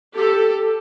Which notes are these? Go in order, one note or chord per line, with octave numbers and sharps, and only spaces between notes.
G4 A4